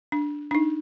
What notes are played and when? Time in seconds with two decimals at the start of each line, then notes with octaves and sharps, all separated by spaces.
0.12 D4
0.51 D4 D#4